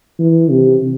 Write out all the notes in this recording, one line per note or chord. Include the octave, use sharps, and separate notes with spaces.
E3
C3